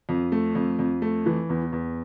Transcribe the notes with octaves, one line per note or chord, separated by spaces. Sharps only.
F2
A3
F2
F2
A3
E3
E2
E2